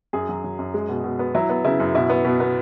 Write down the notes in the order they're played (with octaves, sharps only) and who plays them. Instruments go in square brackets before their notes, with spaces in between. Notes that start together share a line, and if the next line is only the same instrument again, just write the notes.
[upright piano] F#2 G#4
F#3
F#3
F#2
G#3
B2
B2
B3
F#3 E4
B3
C#3 E4
F#2
B2 E4
B3
B2
B3